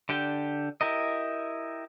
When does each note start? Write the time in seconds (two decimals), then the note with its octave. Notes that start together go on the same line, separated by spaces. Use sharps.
0.09 D3 D4 G4 G5
0.81 E4 G4 A#4 D#5